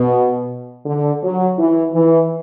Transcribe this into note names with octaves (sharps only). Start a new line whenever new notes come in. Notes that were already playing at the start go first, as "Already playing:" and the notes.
Already playing: B2
D3
F#3
E3
E3